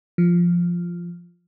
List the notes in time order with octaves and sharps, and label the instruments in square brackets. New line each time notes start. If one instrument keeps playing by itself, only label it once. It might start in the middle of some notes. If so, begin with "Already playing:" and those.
[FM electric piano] F3